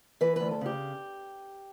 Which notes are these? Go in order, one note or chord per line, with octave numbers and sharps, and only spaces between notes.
E3 B4
D2 B4
A4
C#3 G4